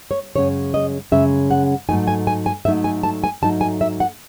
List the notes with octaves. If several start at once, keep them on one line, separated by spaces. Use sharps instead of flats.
C#5
F#2 C#3 G#3 C#4 C#5
D#5
F#2 C#3 G#3 C#4 E5
F#5
G#2 F#3 A3 D#4 G#5
G#5
G#5
G#5
G#2 F#3 A3 D#4 E5
G#5
A5
G#5
G#2 F#3 A3 D#4 A5
G#5
E5
F#5